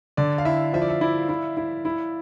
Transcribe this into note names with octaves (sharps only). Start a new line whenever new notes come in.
D3 D5
F5
E4 E5
F3 E5
D5
E5
E4 D5
E4
E4
E4